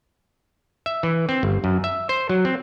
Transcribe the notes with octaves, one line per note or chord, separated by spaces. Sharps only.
E5
E3
C4
G1
F#2
E5
C5
F#3
C4